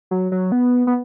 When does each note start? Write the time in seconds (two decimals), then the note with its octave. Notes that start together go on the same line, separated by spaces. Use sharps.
0.11 F#3
0.32 F#3
0.52 B3
0.87 B3